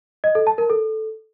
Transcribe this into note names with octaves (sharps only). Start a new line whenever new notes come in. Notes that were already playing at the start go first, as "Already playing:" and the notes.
D#5
A4
A5
A#4
A4